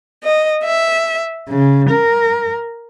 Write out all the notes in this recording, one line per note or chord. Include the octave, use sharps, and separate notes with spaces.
D#5
E5
C#3
A#4